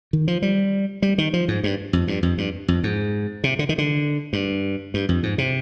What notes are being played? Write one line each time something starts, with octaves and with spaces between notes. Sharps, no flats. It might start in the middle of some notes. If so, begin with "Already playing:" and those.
D#3
F3
G3
G3
D#3
F3
G#2
G2
F2
G2
F2
G2
F2
G#2
C3
D3
D#3
D3
G2
G2
F2
G#2
C3